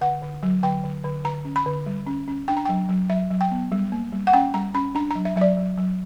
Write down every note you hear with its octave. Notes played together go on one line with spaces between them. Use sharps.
D3 F#5
D3
F#3
D3 G5
D3
D3
D3 A#5
C#4
B5
D3
G3
C#4
C#4
D4 G5
A#5
F#3 G5
F#3
F#3 E5
F#3
G5
B3
G3
A#3
G3
F#5
C#4 G5
G3 A#5
C#4 B5
D4 A#5
A#5
F#3
E5
F#3 E5
D5
F#3
F#3